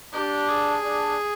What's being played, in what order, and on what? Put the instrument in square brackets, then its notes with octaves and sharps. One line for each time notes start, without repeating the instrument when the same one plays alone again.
[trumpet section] D4 [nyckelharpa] G4
[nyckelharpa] G#4
[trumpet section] D4